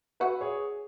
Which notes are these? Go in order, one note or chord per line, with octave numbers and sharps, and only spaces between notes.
F#4 B4 E5
G#4 C#5